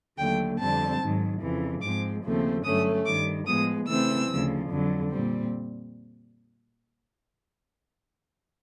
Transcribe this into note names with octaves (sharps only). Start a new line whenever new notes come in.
D#2 D3 F#3 A3 G5
F2 D3 G3 C4 A5
G#2 D#3 F#3
F2 C#3 E3
G#2 F3 G#3 C4 D6
D#2 C#3 F3 A3 C4
G2 D3 F#3 A3 C#4 D#6
G2 D#3 G3 D6
A2 F3 G#3 B3 D#6
C#3 E3 A3 C4 E6
D2 C#3 F3
F2 D3 F#3
A#2 G3 C4